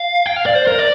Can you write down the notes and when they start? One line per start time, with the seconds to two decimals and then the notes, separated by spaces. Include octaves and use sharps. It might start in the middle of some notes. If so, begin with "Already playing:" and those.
Already playing: F5
0.26 G5
0.36 F5
0.46 D5
0.55 C5
0.67 A#4
0.78 D5